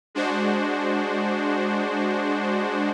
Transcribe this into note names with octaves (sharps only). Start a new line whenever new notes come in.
G#3 D4 F#4 C5